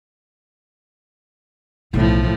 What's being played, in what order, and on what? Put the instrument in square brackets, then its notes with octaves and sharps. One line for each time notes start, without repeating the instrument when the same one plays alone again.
[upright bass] B1 E3 [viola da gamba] A2 F3